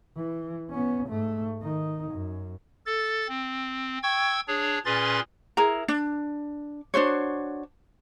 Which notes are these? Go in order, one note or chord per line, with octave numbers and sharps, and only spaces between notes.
E3
B3 C#4
G#2 A3
D#3 D#4
F#2
A4 A6
C4
G5 C#6 E6 G#6
D4 G#4 C#5
A#2 C#4 G#4 B4 C6 A6
E4 G#4 A#4 A#5
D4
D4 F#4 C5 C#5